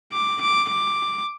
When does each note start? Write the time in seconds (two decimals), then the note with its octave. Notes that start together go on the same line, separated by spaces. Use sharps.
0.13 D6
0.41 D6
0.70 D6